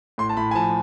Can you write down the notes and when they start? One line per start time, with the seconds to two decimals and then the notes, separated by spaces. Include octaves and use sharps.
0.18 A2 C6
0.29 A5
0.37 A2 B5
0.51 G#5
0.55 F3 A5